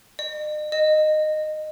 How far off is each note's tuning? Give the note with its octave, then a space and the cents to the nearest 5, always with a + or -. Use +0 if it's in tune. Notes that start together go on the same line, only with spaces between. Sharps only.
D#5 -45
D#5 -15